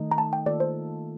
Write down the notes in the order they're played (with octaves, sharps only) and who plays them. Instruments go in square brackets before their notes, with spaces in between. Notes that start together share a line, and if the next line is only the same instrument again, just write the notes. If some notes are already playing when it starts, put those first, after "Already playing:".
Already playing: [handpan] D#3 A3 D#4
[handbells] A#5
A5
G5
[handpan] D#3 A#3 F4 A4 [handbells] D5
[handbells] C5